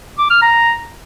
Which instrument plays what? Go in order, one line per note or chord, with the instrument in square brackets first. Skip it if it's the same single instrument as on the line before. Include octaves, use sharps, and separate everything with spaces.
[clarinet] D6
F6
A#5